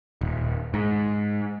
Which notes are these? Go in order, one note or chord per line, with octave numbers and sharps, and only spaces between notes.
D#1
G#2